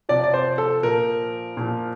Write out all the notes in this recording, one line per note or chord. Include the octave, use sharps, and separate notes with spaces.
C3 F3 D5
D5
C5
A4
A#2 F3 A#4
A#2 F3